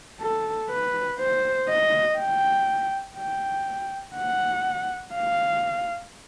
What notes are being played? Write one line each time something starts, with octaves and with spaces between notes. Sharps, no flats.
A4
B4
C5
D#5
G5
G5
F#5
F5